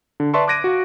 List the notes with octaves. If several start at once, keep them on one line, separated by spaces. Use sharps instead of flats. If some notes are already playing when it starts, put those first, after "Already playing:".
D3
B4 D5 E5 A5 C6 C#6
D6 F#6 G#6 A#6 D7 D#7
F#4 F5